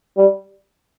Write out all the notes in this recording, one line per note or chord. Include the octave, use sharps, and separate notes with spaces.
G3